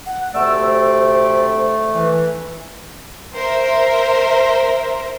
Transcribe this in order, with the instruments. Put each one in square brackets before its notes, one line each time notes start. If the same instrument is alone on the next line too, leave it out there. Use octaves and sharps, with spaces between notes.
[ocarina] F#5
[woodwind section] D2 C3 D5 [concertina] A3 [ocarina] E6
[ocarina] C5
[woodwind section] E3
[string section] A#4 C5 E5